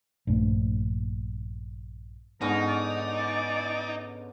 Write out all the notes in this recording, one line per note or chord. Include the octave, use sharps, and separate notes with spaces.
A#1 G2 A3
G#2 D3 B3 C#4 D#4 A#4
D5